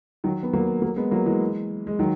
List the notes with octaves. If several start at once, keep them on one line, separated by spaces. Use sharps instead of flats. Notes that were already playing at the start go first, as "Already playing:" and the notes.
D#3 F#3
B3
F#3 A#3
F#3 A#3
G#3 B3
F#3 A#3
E3 G#3
G#3
D#3 F#3